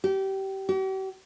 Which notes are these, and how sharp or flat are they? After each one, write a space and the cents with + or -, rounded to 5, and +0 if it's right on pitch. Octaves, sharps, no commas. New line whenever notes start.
G4 -25
G4 -45